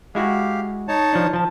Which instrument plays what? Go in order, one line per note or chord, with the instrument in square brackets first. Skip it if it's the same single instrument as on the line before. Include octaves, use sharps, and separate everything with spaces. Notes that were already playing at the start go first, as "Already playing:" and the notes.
[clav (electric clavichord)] G#3 E4 F#4 [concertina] G4 F5
[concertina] D#4 C#5 A5
[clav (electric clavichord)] F3 D4
F3 A5